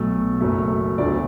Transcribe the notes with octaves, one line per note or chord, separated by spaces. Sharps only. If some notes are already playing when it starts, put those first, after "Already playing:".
Already playing: B1 B2 F#3 A3
F#1 F#2 F#3 A3
E1 D2 D3 A3 D5